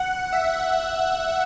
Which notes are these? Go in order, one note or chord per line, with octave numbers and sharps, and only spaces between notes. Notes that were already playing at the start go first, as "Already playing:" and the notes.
Already playing: F#5
E5